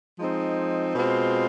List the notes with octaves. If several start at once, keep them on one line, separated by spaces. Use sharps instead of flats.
F3 G#3 C4 D#4
B2 G#3 C4 F4